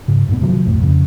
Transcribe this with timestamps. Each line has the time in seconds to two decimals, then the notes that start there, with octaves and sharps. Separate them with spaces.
0.08 G#2 C#3
0.28 G2 A#2 G#3 B3
0.41 C3 D#3 F3 F#3
0.65 B1 F2 A2
0.80 F2 C#3